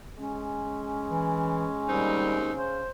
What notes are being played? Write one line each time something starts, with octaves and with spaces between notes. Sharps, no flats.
G#3 C#4
E3
D#2 G3 C4 D#4
C#3 C5